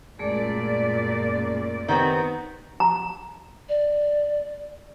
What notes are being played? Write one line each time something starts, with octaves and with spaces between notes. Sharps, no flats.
F#2 A#2 G#3 A3 G#4 D5
D#3 B3 C4 G4
A#5
D5